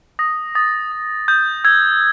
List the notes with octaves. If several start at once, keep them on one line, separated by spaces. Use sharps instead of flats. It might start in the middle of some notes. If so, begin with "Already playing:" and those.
D#6 A#6
D#6 A6
D#6
D#6 G6
E6 G#6